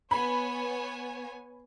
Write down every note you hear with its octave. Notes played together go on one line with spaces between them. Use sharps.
B3 C#5 G#5 B5